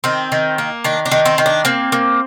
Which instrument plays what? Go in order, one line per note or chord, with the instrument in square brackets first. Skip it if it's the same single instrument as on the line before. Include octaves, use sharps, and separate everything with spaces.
[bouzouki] D#3 C4
D#3
A#3
D#3 D4
D4
D#3
C4
D#3
D4
A#3 C4
A#3